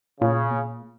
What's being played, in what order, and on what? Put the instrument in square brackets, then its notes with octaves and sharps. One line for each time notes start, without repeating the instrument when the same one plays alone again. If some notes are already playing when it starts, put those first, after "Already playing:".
[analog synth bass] A#2 [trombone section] C#3
[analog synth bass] B2
A#2